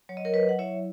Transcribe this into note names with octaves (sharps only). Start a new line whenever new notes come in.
F#3 C#5
D#5
A#4 C#5
F#3 B4 D#5
F#5
E4 C#5 E5